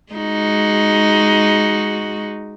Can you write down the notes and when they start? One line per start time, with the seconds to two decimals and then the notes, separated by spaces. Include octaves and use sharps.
0.13 G#3 D#4 F#4